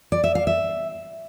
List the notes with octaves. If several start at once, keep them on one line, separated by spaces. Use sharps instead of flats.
D5
E5
F5
E5